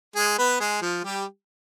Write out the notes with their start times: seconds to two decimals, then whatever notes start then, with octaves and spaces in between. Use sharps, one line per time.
0.16 G#3 G#4
0.38 B3 B4
0.60 G#3 G#4
0.82 F3 F4
1.04 G3 G4